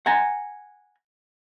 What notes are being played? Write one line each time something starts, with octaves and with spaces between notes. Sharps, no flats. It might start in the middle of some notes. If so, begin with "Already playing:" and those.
F#5 G#5 A#5